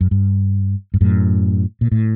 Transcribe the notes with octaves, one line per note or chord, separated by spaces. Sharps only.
F#2
G2
G2
F#2 A2
A#2
A2